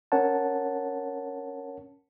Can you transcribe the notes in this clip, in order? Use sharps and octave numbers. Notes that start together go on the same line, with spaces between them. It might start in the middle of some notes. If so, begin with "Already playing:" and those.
C#4 A#4 C#5 F#5 A5